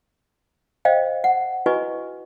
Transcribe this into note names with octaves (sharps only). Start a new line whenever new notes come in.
C5 D#5 F5 G5
F#5
E4 F#4 B4 D#5 G#5 C#6